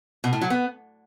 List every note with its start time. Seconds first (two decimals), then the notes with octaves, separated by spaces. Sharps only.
0.24 B2
0.33 A2
0.41 F#3
0.50 B3